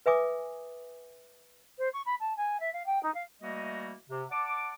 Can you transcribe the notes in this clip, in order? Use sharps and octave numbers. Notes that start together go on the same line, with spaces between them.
B4 E5 G#5 D6 D#6
C5
C#6
B5
A5
G#5
E5
F5
G5
D#4
F5
E3 G3 A3 A#3 F#4 D#5
C3
D5 F#5 A5 D6